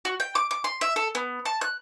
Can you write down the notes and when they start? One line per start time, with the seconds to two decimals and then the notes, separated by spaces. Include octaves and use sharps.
0.05 F#4
0.20 G5
0.35 D6
0.51 D6
0.64 C6
0.81 E5
0.96 A4
1.15 B3
1.45 A5
1.61 F#6